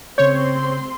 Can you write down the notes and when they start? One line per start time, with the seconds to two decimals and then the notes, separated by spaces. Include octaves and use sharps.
0.18 C#3 C4 C#5 C6 G6